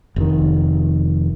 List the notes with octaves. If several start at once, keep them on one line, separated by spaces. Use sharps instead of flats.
F1 D#3